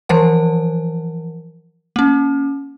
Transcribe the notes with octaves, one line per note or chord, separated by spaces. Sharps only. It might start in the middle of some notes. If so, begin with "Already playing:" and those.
E3 F3 A#4 F#5
A#3 C#4